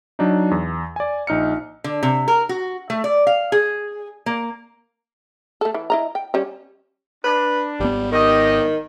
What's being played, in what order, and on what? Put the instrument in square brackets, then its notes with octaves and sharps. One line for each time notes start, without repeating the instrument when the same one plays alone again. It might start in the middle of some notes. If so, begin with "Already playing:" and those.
[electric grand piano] F#3 D4 D#4
E2
D5 G#5
A#1 D#4 F6 C#7
[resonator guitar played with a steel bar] D3
C3
A#4
F#4
A3
D5
F5
G#4
A#3
[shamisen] A3 A4
E3
E4 D#5 A#5
G5
G3 C#4
[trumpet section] D4 [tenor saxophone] B4
[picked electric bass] G#1 B3 [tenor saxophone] G3
[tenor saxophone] D#3 [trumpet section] G4 D#5